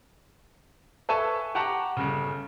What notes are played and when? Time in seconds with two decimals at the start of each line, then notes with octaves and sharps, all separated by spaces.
1.09 A4 B4 E5 G#5 A5 C#6
1.55 G4 F#5 A5 A#5 C#6
1.97 G1 C#3